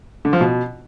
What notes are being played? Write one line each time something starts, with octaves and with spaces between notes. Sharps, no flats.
D3
F3
B2